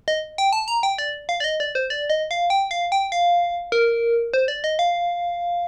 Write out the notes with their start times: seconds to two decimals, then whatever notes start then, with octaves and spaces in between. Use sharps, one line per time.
0.08 D#5
0.38 G5
0.53 A5
0.68 A#5
0.83 G5
0.98 D5
1.29 F5
1.40 D5
1.44 D#5
1.60 D5
1.75 C5
1.90 D5
2.10 D#5
2.31 F5
2.50 G5
2.71 F5
2.92 G5
3.12 F5
3.72 A#4
4.34 C5
4.48 D5
4.64 D#5
4.79 F5